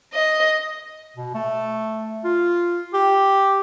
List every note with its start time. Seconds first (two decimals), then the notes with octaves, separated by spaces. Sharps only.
0.13 D#5
1.17 B2
1.34 A3
2.24 F4
2.94 G4